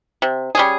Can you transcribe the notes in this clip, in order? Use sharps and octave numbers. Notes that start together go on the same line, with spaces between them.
C3
G3 C#4 G#4